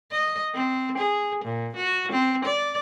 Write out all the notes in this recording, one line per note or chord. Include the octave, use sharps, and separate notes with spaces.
D#5
C4
G#4
A#2
F#4
C4
D5